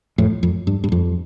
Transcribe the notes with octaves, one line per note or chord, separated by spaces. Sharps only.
F2 A2
F2
G2
G2
F2